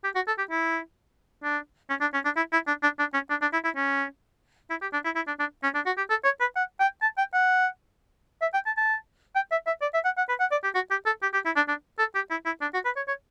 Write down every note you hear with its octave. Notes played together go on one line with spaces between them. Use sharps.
G4
F#4
A4
G4
E4
D4
C#4
D4
C#4
D4
E4
E4
D4
D4
D4
C#4
D4
D4
E4
E4
C#4
E4
G4
D4
E4
E4
D4
D4
C#4
D4
F#4
G4
A4
C#5
B4
F#5
G5
A5
G5
F#5
E5
G5
A5
A5
G5
E5
E5
D5
E5
F#5
F#5
B4
F#5
D5
G4
F#4
G4
A4
G4
G4
E4
D4
D4
A4
G4
E4
E4
D4
F#4
B4
C#5
C#5